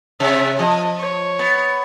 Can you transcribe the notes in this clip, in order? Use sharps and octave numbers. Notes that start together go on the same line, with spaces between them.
C3 E5
F3 D#5
C#5
B3